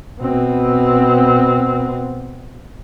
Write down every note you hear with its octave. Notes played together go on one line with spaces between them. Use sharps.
B2 C4